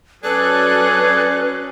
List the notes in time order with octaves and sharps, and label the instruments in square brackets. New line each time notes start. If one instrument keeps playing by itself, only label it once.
[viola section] F#3 C#4 [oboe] G#4 [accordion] A4 D5 F#6 [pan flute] B4